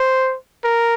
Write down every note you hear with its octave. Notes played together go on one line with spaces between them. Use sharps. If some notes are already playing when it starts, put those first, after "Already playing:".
Already playing: C5
A#4